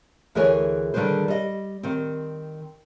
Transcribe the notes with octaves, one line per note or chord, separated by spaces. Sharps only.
D2 E3 G#4 A#4 C#5 G#5
D3 D#3 G3 G#4 B4 C5
G3 D#5
D#3 C4